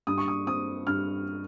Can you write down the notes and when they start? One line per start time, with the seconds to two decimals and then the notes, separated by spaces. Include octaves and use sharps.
0.07 G2 D#6
0.18 C#6
0.28 D#6
0.46 C4 D#6
0.87 G2 F6